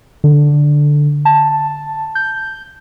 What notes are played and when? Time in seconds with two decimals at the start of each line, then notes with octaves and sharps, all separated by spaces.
0.24 D3
1.25 A5
2.15 G6